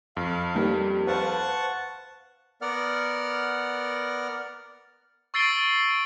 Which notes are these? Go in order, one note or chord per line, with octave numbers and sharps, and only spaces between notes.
F2 F5
D#3 G3 A#3
B4 C5 F5 F#5 A5 C#6
B3 A#4 D5 F#5 F6
C#6 E6 A6 C7 D7 G7